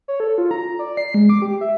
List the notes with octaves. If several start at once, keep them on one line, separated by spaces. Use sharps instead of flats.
C#5
A4
F4
A#5
D5
C7
G#3
D6
G4
E5